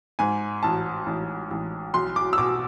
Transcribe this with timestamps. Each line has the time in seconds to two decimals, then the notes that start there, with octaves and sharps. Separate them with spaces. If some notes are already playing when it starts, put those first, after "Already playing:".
0.19 G#2 G#5
0.63 A1 A5
1.06 A1
1.51 A1
1.94 B1 C6
2.16 D6
2.33 E6
2.38 B2 D6